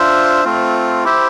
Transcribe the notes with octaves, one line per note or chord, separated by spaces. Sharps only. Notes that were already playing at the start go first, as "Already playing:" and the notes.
Already playing: D4 F4 C5 E5
A3 C4 F4
E4 G4 C5 E5